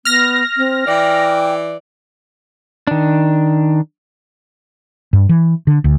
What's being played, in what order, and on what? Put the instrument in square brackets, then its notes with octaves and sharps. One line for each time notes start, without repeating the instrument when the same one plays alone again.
[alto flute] B3 [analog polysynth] F6 A#6
[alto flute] C4
[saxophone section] E3 D5 [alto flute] G5
[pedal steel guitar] D#3 D4
[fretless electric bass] G2
E3
D3
D2